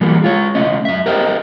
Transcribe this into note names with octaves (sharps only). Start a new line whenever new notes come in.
E3 F#3 G3 A3 A#3
G#3 F4 C#5
C#2 A3 C#4 D#5
F#2 E5
G4 A#4 C5 D#5 E5 G5